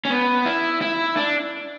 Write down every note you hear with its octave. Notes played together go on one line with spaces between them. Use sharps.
C#4
B3
E4
E4
D4